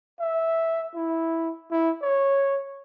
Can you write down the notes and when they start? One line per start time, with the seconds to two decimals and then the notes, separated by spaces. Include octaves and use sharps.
0.20 E5
0.96 E4
1.71 E4
2.02 C#5